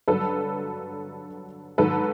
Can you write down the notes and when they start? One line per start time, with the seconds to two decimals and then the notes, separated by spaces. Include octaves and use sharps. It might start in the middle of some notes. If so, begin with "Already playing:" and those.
0.08 G2 D3 F#3 A4 B4
1.78 G#2 D#3 F#3 A4 B4